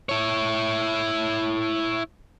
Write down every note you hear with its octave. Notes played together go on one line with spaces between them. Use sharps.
E4 C#5